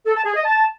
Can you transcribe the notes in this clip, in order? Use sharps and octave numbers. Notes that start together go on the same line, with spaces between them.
A4
A5
G#4
D#5
A5